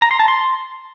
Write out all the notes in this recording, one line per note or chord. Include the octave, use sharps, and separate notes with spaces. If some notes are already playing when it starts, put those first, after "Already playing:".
A#5
C6
A5
C6